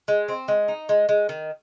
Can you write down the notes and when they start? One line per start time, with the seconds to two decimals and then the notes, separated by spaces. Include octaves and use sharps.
0.08 G#3
0.28 C4
0.48 G#3
0.68 D#4
0.89 G#3
1.09 G#3
1.29 D#3